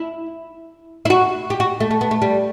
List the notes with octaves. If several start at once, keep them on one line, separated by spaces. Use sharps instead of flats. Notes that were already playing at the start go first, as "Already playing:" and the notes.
Already playing: E4
E4
F#4
G4
F#4
A3
A3
B3
A3
G3